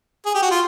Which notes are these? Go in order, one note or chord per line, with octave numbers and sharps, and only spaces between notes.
G#4
G4
F#4
F4